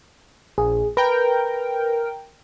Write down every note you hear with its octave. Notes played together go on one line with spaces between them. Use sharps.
A#1 G#4
A#4 B4 G5